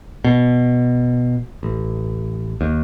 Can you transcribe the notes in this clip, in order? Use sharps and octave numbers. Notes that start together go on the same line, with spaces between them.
B2
A1
D#2